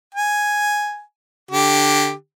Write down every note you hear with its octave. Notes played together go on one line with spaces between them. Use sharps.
G#5
D3 G4